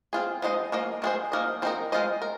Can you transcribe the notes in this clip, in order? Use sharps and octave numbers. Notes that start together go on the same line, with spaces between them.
C4 F4 G#4
F3 G#3 D#4 C5 D#5
F3 A#3 G#4 D#5
D#3 G#3 C4 G#4 C5
F3 A#3 D#4 A#4 D#5
F3 C4 D#4 A#4
G#3 F4 C5 D#5
A#4